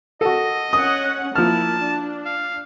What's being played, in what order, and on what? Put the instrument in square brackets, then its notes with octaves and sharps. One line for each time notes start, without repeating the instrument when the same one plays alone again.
[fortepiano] F#4 A4 [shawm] D#5
[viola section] C#4 F#5 [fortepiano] D#6
[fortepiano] F3 F6 [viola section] A#3 E4 [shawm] A5
[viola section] D4
[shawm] F5